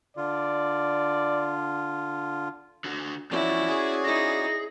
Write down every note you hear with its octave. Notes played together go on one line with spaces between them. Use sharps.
D3 F4 D5
D3 F#4
E2 F3 C#4 E4 F#4 D5
G#4
D#4 E4 A#6